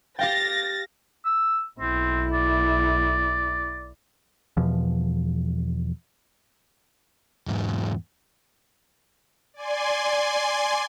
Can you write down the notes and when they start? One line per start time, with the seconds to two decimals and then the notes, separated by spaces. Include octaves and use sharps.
0.19 G4 F5 G5 A6 A#6
1.25 E6
1.80 B1 C4 E4
2.33 D5
4.57 E2 B2 F3
7.47 E2 G#2
9.54 D5 G#5 C6